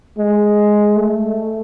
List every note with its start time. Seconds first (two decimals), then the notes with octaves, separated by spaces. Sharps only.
0.18 G#3
0.96 A3